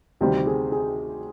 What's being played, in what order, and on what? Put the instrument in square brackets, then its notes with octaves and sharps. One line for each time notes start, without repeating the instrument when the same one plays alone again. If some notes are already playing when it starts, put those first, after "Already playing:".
[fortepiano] D2 C3 D#3 G3 C4 [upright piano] G4
[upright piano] G#4
G#4